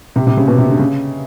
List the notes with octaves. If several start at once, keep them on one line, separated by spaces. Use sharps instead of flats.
C3
C3
C#3
B2
C3
D3
C#3